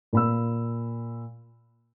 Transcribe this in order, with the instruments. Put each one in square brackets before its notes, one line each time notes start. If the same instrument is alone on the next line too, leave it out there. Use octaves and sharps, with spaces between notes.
[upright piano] A#2 B5 E6